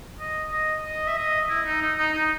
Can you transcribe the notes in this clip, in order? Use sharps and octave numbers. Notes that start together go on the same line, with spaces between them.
D#5
D#5
D#5
E5
D#5
E4
D#4
D#4
D#4
D#4